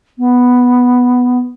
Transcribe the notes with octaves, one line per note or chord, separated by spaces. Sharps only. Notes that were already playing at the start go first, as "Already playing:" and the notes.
B3